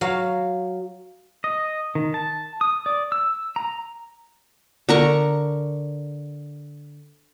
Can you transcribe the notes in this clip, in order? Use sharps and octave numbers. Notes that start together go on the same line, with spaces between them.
F#3 F5
D#5
D#3
A5
D#6
D5
E6
A#5
D3 A#4 C#6